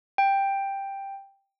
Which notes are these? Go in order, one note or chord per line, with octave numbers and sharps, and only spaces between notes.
G5